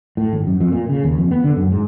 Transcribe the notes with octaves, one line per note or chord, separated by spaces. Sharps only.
A2
G#1
F#2
F2
A#2
C#3
D#2
F2
B3
D3
F#2
G#2